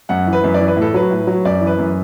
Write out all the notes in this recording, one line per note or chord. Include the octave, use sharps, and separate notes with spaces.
F#2 F#5
E3
B4
F#2
D5
E3
B4
A2 A4
F#3 B4
A2
F#3
F#2 D5
E3
B4
F#2